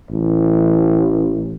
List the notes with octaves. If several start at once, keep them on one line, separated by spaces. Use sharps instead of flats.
A1